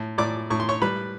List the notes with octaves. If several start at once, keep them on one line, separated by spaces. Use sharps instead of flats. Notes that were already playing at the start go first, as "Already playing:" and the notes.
Already playing: A2
A2 D5 D6
A2 C#6
C6
C#5 C#6
G3 B4 B5